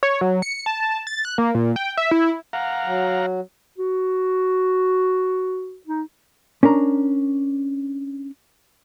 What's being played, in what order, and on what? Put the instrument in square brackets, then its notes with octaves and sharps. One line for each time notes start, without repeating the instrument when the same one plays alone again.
[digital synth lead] C#5
F#3
C#7
A5
A6
F#6
A#3
A#2
G5
E5
E4
[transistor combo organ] F5 F#5 A#5
[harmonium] F#3
[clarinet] F#4
D#4
[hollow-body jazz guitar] C#4 D4 A#4 A#5